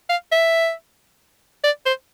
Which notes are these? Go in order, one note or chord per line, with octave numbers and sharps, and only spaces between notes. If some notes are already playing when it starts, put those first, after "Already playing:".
F5
E5
D5
C5